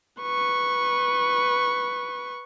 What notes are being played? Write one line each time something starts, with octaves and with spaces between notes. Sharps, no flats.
B4 C#6